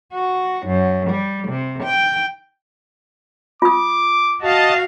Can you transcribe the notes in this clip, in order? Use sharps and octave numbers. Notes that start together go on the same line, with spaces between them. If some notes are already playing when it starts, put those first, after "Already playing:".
F#4
F#2
G3
C3
G5
F4 D6 D#6
F#4 D#5 F5 A5